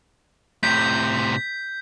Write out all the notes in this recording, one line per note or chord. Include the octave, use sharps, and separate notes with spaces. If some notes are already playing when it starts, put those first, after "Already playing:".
A2 C3 G6 B6